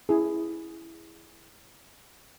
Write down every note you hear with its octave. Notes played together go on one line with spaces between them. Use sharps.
E4 G#4